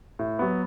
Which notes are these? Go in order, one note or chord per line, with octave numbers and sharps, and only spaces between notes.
A2
F#3 B3